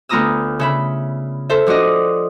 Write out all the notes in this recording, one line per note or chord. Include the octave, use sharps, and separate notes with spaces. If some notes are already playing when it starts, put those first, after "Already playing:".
D2 B3 F4 A#5 D#6 E6
C#3 E5 B5
A4 C5 E5
F3 D4 F#4 D5 D#5